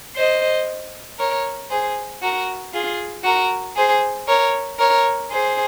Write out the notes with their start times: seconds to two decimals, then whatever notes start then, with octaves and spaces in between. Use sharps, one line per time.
0.15 C5 D#5
1.19 A#4 C#5
1.70 G#4 C5
2.22 F#4 A#4
2.73 F4 G#4
3.24 F#4 A#4
3.76 G#4 C5
4.27 A#4 C#5
4.79 A#4 C#5
5.31 G#4 C5